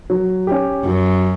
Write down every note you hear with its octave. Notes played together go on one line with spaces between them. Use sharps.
F#3
C#4 G4
F#2 F#3